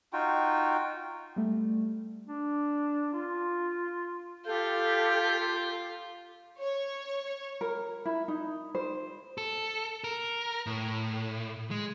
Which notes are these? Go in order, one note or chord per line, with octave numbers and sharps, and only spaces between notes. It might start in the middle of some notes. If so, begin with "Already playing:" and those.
D#4 F4 F#4 G5
G3 A3
D4
F4
F4 G4 A4 G6
C#5
A#4
E4
D#4
C5
A4
A#4
A2
G#3